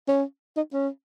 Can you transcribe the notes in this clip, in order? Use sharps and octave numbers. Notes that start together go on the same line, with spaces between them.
C#4
D#4
C#4